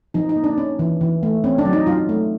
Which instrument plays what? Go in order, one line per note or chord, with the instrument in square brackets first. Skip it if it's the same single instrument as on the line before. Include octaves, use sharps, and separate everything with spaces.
[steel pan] F3 D#4
D#4
A#3
D4
C#4
E3
E3
A3
C4 C#4
D4
F#3
D#4
F#3 F4
A3